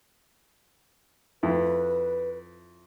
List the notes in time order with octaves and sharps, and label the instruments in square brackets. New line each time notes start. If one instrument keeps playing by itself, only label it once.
[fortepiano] F2 E4 [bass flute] B4